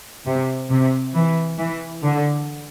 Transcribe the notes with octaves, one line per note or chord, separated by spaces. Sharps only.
C3
C3
E3
E3
D3